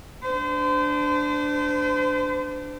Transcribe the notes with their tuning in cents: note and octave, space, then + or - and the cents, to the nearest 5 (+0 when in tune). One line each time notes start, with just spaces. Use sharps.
D4 +0 C5 -35